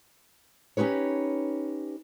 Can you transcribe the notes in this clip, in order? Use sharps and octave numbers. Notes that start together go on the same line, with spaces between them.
C#4 D#4 G4 B4 C#5